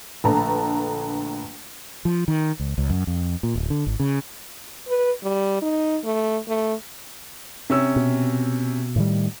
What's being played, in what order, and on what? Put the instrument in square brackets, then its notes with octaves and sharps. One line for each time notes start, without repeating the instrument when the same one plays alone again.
[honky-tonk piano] A#1 D3 A3 B4 A5 A#5
[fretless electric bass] F3
D#3
C#2
C#2
F#2
F2
A#2
D1
D3
G#1
C#3
[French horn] B4
G3
D#4
A3
A3
[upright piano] C3 C#4 E6
[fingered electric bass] B2
A2 D#3 G3